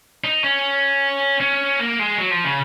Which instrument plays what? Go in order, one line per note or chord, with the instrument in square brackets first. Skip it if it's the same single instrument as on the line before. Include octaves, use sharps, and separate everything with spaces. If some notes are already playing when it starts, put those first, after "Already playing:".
[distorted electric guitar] D#4
C#4
C#4
A#3
G#3
F#3
F3
C#3